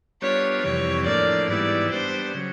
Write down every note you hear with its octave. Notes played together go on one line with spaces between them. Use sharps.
G3 B3 D4 F4 C#5
F2 C3 E3 G3 C#5
A2 F3 A#3 D4 D5
G#2 E3 G3 B3 E4 D5
G3 B3 D4 C5
C#3 F#3